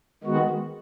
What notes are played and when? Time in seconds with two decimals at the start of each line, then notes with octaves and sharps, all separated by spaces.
0.24 D#3 G#3 B3 F#4